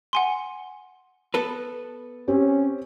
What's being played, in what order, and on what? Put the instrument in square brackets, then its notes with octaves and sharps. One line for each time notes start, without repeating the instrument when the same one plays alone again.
[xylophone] F#5 G#5 C6
[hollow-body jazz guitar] B3 A4 B4
[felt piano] C4 G4 [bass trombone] C#4